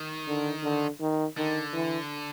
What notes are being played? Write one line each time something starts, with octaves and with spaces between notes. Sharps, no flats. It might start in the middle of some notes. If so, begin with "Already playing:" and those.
Already playing: D#3
D3
D3
D#3
D3 D#3
E3